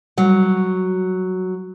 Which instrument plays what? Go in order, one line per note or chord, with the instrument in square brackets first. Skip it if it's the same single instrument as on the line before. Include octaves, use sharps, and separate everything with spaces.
[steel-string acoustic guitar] F#3 [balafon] G3